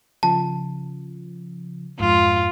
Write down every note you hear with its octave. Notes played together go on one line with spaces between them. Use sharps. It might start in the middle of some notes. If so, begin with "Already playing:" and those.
C#3 F3 A5
F2 G#2 F4